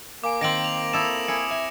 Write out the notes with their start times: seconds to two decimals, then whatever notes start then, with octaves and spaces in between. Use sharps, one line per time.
0.24 A#3 F5 G#5 D6 D7
0.41 D#3 C4 A#4 A#6 D7 F#7
0.64 F7
0.93 E4 A4 D#6 E7
1.28 E4 G#4 C#7
1.51 E5 G#5